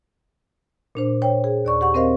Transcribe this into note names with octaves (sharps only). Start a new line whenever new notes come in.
A#2 D4 C5
C5 C#5 G5
G#4
D#2 D5 C#6
G4 F#5 C#6
C4 A#4 C5 D#5 F5